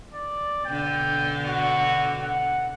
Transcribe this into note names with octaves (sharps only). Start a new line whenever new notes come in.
D5
B2 D3 G5
F#4
F#5